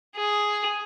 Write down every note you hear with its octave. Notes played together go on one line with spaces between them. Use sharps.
G#4